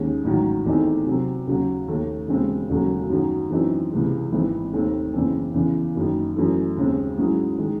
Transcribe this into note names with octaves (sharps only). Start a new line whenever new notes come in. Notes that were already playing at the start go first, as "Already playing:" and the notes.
Already playing: D#2 D#3 G#3 C#4 G#4
A1 G#2 D#3 F#3
E2 D#3 A3 C4 D#4
C3 F#3 C4
D#2 C#3 F#3
D#2 D#3 A3
E1 D#2 C#3 G#3 C4
E1 D#2 C#3 F#3 A3
F#2 D#3 F#3
F#2 E3 C4 D#4
C#2 C3 E3 G#3
G#1 G#2 E3 C4
D#2 D#3 A3 C4
F#1 E2 C#3 E3 C4
E2 C#3 E3
F#1 F#2 D#3
F#2 E3 A3
D#2 C#3 G#3 C4
G#2 F#3 C#4 E4 G#4
D#3 G#3